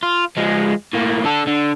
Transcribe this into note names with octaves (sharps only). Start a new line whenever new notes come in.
F4
F3 G#3
A2 A#3
D3 A4
D3